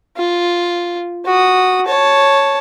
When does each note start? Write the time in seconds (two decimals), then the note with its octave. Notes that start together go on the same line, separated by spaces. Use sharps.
0.17 F4
1.25 F#4 D#6
1.86 C#5 A5